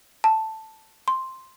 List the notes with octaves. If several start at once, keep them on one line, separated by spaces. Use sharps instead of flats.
A5
C6